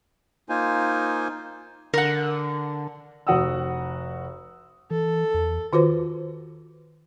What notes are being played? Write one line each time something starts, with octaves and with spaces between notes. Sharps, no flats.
A#3 D#4 F4 C5 G#5
D3 A#4 F#5
F1 F#4 F#5 D#6 E6
E3 A4
E2
D#3 F4 F#4 B4 C5